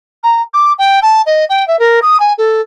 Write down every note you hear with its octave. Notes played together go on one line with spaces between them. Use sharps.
A#5
D6
G5
A5
D#5
G5
E5
A#4
D#6
G#5
A4